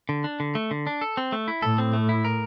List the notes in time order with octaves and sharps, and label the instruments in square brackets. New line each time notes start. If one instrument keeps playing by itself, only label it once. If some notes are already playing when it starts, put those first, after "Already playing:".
[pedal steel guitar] D3
D4
D3
A3
D3
D4
A4
C4
A3
E4
[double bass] A2 [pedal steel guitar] A4
[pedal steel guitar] C4
A3
E4
A#4